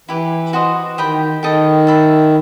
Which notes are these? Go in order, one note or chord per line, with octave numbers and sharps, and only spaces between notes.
E3 E4 G4 B4
F#4 C5 D#5
D#3 G4 D#5 G5 B5
D#3 A4 D#5 G5
A4 E5 B5